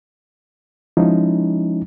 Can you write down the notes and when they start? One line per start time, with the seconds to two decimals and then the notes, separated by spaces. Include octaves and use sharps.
0.97 F3 G#3 C#4 D#4 E4